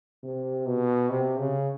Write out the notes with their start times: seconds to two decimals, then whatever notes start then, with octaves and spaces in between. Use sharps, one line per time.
0.23 C3
0.67 B2
1.10 C3
1.39 C#3